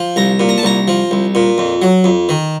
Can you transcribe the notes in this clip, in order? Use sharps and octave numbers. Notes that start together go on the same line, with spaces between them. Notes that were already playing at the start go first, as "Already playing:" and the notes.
Already playing: F3
C2 A#5
A#2
A#5
A5
C2 A#5
F3
C2
A#2
F2
F#3
F2
D#3